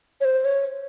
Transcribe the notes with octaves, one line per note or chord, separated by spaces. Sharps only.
C#5
C5
C#5